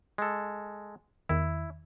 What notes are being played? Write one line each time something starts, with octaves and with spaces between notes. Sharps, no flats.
G#3 A4
E2 D#3 E4